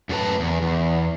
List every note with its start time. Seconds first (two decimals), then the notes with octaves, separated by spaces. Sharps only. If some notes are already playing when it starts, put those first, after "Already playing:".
0.09 F#2 A3 F#4 B4 A5
0.40 E2
0.62 E2